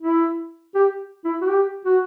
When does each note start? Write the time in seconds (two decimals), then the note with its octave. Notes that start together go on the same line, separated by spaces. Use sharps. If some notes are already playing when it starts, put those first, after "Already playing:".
0.01 E4
0.75 G4
1.25 E4
1.41 F#4
1.49 G4
1.85 F#4